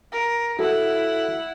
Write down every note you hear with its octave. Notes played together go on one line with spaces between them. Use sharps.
A#4
E4 F#4 A4 F#5